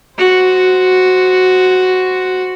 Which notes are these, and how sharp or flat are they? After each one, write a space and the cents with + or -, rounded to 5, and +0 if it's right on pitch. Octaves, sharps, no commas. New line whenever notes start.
F#4 +0 C5 +0